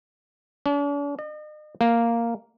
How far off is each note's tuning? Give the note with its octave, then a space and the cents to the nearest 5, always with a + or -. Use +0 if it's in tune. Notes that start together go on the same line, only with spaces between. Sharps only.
D4 -45
D#5 -40
A#3 -5